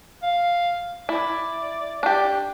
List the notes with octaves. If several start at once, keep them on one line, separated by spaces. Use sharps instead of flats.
F5
E4 D5
D4 G4